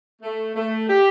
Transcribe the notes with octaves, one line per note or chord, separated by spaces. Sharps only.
A3
A3
G4